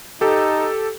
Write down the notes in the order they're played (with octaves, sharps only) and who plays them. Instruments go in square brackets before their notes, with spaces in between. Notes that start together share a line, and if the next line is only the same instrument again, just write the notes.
[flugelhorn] D#4 [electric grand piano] G4 A4